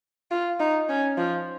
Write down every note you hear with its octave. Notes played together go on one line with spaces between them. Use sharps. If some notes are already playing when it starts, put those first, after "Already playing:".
F4
D#4
C#4
F3